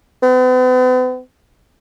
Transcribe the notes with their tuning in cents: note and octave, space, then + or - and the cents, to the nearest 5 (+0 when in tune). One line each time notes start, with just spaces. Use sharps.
B3 +45